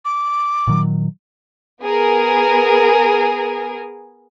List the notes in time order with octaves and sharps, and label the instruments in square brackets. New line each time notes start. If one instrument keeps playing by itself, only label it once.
[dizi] D6
[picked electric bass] A#2 D#3 F#3
[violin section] B3 G#4 A#4